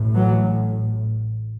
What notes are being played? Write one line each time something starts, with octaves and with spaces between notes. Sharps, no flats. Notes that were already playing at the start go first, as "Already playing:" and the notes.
Already playing: A1 A2
E3 F#3